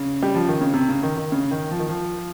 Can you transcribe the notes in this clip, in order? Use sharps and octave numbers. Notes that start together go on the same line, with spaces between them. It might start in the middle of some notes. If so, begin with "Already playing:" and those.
Already playing: C#3
G3
F3
D#3
C#3
C3
C#3
D#3
D#3
C#3
D#3
F3
D#3
F3